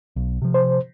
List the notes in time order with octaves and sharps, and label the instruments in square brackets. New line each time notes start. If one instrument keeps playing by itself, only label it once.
[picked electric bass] B1
C3 F3
[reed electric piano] C5